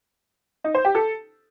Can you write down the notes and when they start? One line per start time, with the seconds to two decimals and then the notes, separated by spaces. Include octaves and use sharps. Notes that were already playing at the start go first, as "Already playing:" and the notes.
0.64 D#4
0.75 C5
0.85 G4
0.95 A4